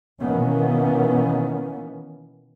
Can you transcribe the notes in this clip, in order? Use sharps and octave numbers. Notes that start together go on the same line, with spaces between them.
B2 D#3 E3 A#3 B3 C#4